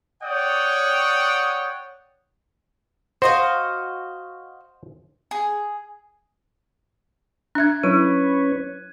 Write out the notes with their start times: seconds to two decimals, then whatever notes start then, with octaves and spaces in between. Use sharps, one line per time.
0.23 C#5 D5 F#5 G5 D#6
3.22 F#4 C5 D#5 F5
5.31 G#4
7.55 D4 E5 F#6 G#6
7.83 F#3 C#4 E4 B4 C#5 D#7